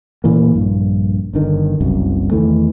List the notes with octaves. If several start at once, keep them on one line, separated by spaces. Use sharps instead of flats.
A#2 E3 A#3
A#1 G2
G1 D3 D#3
F#1 C2 F#2
E2 D#3 E3 A3